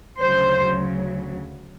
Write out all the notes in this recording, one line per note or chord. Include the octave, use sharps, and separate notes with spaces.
D2 C#3 F#3 C5